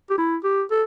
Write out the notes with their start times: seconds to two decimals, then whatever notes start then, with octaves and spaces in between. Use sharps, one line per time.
0.10 G4
0.18 E4
0.44 G4
0.71 A4